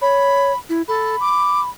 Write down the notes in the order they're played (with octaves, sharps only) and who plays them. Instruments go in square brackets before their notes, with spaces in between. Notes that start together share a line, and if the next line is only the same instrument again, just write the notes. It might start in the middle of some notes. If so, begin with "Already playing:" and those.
[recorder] C#5 [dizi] B5
[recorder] E4
[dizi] A4 [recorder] B5
[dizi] D6